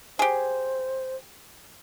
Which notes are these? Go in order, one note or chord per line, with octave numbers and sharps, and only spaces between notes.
G4 G#4 C5